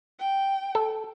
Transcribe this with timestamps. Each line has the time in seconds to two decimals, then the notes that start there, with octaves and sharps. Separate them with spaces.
0.19 G5
0.75 A4